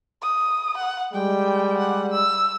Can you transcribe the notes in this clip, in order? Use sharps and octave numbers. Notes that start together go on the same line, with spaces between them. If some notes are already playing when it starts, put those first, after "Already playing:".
D#6
F#5
G3 G#3 G5
F#5
E6